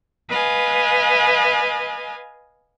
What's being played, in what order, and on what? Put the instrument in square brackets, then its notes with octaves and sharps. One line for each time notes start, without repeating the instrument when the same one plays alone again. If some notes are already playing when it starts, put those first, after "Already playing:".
[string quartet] B4 D#5 F5 G#5